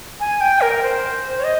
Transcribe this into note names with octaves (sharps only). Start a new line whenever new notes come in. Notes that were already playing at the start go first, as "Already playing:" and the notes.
G#5
G5
A#4
C5
C#5
D#5